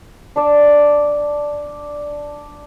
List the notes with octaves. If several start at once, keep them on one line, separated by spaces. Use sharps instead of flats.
D4 D5